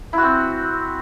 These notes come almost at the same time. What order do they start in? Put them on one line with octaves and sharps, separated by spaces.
E4 F#4 C4